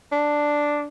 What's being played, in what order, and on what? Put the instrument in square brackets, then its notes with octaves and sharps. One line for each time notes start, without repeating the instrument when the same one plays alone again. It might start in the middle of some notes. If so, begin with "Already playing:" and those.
[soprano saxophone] D4